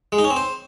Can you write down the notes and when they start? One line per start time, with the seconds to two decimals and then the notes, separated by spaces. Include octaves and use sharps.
0.12 G#3
0.18 D#4
0.24 C#4
0.30 C4
0.36 C5